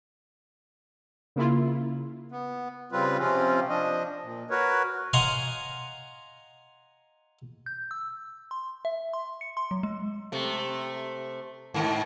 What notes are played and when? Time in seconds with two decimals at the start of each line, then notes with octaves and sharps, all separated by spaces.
1.36 C#3 A#3 E4 F4
2.32 B3
2.92 C#3 G3 C4 F4 B4
3.19 C3 F3 C4 C#4 F4
3.69 F3 D4 D#5
4.23 A#2
4.50 F#4 A#4 B4 C#5
5.13 D#5 F5 F#5 G#5 A#5 C6
7.66 G6
7.91 E6
8.51 C6
8.85 E5
9.13 C6
9.41 C#7
9.57 C6
9.71 F#3
9.83 G#3
10.32 C3 A3
11.74 G#2 D#3